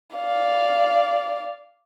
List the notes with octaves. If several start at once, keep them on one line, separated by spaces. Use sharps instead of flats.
D5 F5